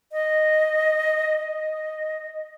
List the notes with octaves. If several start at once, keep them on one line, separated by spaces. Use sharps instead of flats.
D#5
D#5